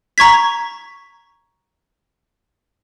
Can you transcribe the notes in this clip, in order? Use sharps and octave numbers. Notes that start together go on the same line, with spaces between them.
A#5 C#6 G#6 B6